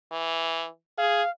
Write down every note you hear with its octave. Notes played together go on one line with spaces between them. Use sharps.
E3
G#4 F5